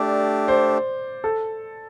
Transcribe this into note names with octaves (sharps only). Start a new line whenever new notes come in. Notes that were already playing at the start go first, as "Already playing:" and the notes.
Already playing: A3 D4 G4 D5
C5
A4